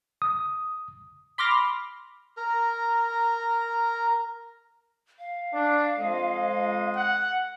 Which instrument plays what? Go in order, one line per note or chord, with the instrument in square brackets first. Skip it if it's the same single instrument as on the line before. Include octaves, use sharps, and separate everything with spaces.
[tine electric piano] D#6
[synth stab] B5 C6 D6 F6 A#6
[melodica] A#4 A#5
[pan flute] F5
[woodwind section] D4
F2 G#3 D#5
[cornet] F#5